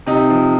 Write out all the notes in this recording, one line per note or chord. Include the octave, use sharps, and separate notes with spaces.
C3 D#4
F3